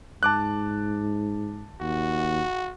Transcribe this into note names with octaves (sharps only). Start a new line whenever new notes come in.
G#2 A5 D6 F#6
D#2 F#4